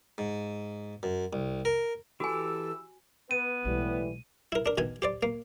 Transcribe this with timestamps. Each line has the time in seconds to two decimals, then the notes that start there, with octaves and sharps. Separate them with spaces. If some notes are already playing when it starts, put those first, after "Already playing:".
0.18 G#2
1.03 F#2
1.33 C2
1.65 A#4
2.20 E3 F#4 G4 A4 G#5 D6 E6
3.31 B3 B4 D#7
3.65 B1 A2 E3 G3 G#3
4.52 E4 A#4
4.66 D4 A#4
4.78 B2 D#3 G#5
5.02 G4 C5 D5
5.23 A#3